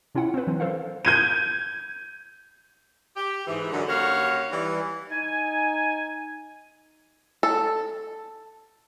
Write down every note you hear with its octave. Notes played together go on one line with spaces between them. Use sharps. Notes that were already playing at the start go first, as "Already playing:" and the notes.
C3 C#4 E4 F4 F#5
C4 B4
E3 F#3 C4
A4 C5 F5
G6 G#6 D#7
G4
G#2 E3
F#2 D3
D#2 C#4 F#4 C#5 F5
E3 G3
D#4 G#5
A4